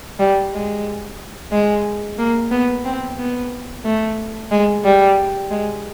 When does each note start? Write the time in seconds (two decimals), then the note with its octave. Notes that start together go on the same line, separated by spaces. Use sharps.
0.19 G3
0.53 G#3
1.52 G#3
2.19 A#3
2.52 B3
2.85 C4
3.19 B3
3.85 A3
4.51 G#3
4.85 G3
5.51 G#3